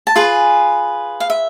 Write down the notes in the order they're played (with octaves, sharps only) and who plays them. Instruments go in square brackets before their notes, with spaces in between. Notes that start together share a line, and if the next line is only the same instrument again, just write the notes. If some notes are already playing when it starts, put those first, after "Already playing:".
[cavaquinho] A5
F4 G#4 B4 G#5
F5
E5